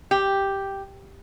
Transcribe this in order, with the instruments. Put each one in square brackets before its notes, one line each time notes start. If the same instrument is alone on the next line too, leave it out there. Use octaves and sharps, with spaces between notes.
[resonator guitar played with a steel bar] G4